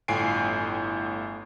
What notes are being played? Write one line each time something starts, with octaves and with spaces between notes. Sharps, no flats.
G1 A2 F4 G#5 C7 D7